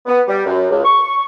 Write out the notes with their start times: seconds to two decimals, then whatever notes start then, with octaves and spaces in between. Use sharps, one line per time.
0.06 B3
0.27 G3
0.46 F#2
0.70 C#2
0.84 C#6